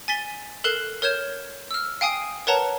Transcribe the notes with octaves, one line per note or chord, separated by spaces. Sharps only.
G#5 A6 B6 G7
A4 A#4 F#6 C7 E7 G7
A#4 C#5 F6 G6 G#6 E7
E6 F6
F5 G5 G#5 D#6 C7
A#4 B4 C#5 F#5 A5 A#5